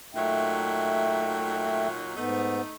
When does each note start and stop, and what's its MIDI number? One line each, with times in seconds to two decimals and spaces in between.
0.15 2.16 46
0.15 2.16 54
0.15 1.88 57
0.15 2.16 63
0.15 1.88 76
0.15 1.88 79
2.16 2.61 44
2.16 2.75 57
2.16 2.61 59
2.16 2.75 63